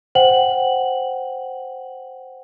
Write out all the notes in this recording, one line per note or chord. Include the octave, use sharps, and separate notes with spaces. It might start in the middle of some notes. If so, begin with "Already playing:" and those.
C5 F#5 G5 F#7